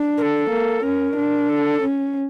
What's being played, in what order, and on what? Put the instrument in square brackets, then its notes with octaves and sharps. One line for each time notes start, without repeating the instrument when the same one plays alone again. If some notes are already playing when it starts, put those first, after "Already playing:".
Already playing: [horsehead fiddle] D4
[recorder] A#4
A4
[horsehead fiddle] A#3
[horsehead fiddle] C#4 [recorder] A#4
[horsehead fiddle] D4
[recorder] A4
[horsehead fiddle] C#4